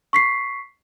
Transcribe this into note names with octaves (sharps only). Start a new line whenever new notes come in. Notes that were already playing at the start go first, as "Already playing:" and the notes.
C#6 B6 C7